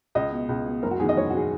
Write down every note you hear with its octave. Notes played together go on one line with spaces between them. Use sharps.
C#2 D#5
B2
C#2
B2
F#1 A#4
F#4
E2 D#3 G#4
D#5
F#1 C#5
F#4
D#3 G#4